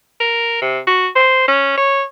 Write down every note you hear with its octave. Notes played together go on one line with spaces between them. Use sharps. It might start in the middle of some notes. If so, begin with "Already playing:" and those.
A#4
C3
F#4
C5
C#4
C#5